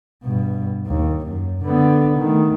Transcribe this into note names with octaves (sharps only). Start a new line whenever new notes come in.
G2 B2
D#2
F#2
D3 B3
D#3 A3